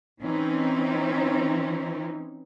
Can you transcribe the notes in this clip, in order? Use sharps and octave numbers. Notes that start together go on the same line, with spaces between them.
E3 C4 C#4 D#4